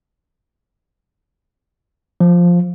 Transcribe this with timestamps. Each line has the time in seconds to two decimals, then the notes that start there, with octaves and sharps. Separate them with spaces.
2.20 F3